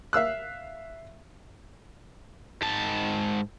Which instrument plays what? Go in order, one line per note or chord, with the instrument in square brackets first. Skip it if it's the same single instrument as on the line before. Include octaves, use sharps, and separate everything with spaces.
[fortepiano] E5 F5 E6 F#6
[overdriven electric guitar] G#2 A5